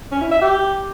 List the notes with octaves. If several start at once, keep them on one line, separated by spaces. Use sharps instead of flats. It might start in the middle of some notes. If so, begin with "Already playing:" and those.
C#4
E4
E5
G4